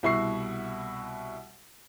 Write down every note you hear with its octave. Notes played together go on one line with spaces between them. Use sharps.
C2 B2 E4 F#4 C#6 C7